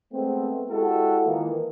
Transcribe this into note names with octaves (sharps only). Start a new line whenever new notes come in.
G#3 A3 B3 C4
G#3 E4 F#4 G4 A4
D#3 E3 A#3 D#4 F4